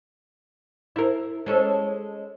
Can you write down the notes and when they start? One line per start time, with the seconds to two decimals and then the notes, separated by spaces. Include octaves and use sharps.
0.96 E4 A#4
1.46 G#3 C#4 A4